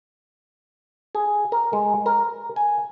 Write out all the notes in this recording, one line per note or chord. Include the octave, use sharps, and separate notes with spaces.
G#4
A#4
G#3
A#4
G#5